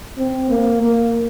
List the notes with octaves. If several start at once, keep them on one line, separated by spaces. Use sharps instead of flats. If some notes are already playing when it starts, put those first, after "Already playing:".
C4
A#3
A#3